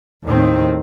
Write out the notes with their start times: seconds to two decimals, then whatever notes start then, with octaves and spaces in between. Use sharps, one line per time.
0.25 D#2 A2 D#3 C4